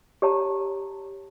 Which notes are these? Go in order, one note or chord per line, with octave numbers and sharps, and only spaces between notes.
G4 C#5 A5 A#5